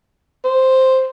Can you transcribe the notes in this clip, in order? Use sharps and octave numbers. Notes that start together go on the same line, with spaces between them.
C5